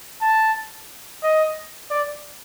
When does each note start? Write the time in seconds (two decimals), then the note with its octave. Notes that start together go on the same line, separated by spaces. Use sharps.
0.22 A5
1.23 D#5
1.91 D5